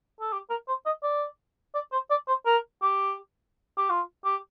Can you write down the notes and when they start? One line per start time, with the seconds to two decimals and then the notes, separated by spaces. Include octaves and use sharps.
0.20 A4
0.32 G4
0.50 A#4
0.68 C5
0.86 D#5
1.03 D5
1.74 D5
1.92 C5
2.10 D5
2.28 C5
2.46 A#4
2.82 G4
3.78 G4
3.90 F4
4.25 G4